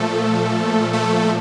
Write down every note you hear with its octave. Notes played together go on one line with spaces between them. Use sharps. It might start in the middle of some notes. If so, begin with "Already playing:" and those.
Already playing: A#2 F3 A3 A4
A3 A4